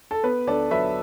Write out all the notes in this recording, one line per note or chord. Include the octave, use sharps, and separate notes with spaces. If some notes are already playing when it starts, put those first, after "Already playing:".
A4
B3 B4
D2 A4 D5
F#3 B4 E5